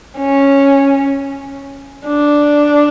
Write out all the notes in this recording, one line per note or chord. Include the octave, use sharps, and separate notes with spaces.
C#4
D4